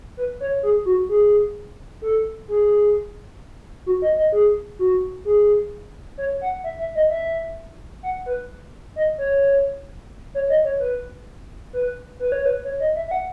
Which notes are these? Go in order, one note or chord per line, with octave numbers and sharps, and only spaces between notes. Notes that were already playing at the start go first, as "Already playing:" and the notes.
B4
C#5
G#4
F#4
G#4
A4
G#4
F#4
D#5
D#5
G#4
F#4
G#4
C#5
F#5
E5
E5
D#5
E5
F#5
B4
D#5
C#5
C#5
D#5
C#5
B4
B4
B4
C#5
B4
C#5
D#5
E5
E5
F#5